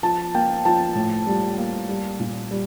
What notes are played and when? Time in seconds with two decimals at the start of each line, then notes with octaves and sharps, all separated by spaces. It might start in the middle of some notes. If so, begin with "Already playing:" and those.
0.03 F3 A5
0.35 A#3 G5
0.65 F3 A5
0.95 A2
1.27 G3
1.58 A#3
1.89 G3
2.20 A#2
2.51 G3